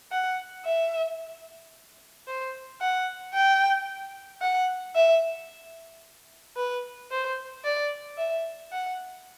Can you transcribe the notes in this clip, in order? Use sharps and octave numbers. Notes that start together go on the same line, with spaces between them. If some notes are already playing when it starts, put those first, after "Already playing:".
F#5
E5
C5
F#5
G5
F#5
E5
B4
C5
D5
E5
F#5